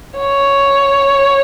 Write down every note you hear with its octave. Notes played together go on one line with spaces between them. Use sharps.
C#5